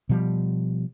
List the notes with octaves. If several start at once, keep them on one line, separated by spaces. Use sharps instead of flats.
B2 F3 G3